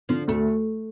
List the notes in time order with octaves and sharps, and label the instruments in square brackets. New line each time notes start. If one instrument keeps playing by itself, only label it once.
[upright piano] D3 [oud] F3
[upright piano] D2 [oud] A3